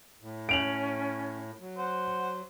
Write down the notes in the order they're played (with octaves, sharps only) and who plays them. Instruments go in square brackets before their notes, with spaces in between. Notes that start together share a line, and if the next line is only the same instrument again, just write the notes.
[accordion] A2
[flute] C#4 [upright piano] D7 F7 F#7
[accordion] F#3
[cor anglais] C5 [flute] F#5